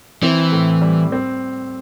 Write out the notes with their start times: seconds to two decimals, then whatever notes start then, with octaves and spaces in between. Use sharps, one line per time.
0.23 E3 C4
0.52 A2
0.81 G3
1.12 C4